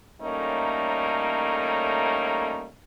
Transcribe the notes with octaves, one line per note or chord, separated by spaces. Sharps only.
A2 G3 A3 A#3 C#4 D#4